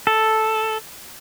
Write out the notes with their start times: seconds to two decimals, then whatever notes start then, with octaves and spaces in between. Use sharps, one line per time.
0.07 A4